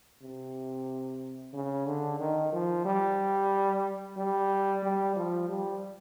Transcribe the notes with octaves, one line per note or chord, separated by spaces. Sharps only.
C3
C#3
D3
D#3
F3
G3
G3
G3
F3
G3